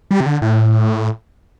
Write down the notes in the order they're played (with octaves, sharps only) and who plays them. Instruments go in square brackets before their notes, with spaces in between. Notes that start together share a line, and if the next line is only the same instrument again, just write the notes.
[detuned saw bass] G3
C3
D3
A2